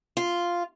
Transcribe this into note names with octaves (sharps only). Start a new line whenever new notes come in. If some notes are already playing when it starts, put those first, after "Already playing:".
F4